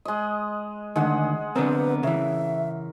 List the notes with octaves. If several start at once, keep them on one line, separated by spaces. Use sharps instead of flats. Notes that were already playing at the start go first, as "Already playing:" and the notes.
G#3 D#5
D2 D3 D#3 G#3 F#5
D3 B3 C4 A#4 B4
C#3 E3 E5